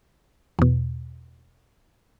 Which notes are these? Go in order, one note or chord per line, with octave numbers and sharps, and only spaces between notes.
E2 B2